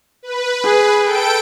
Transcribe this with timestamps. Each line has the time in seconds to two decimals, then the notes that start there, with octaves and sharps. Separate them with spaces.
0.23 B4
0.65 G#4
1.03 A4 G5 D7